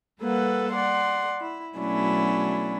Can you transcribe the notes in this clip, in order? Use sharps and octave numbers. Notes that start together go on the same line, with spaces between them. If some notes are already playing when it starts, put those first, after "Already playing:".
G3 A#3 A4 B4 F#5
D5 F#5 C6
E4
B2 F#3 A3 C#4 D4 E4